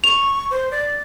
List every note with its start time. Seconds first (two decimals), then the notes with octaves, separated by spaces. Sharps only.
0.04 C#6 F7
0.51 C5
0.71 D5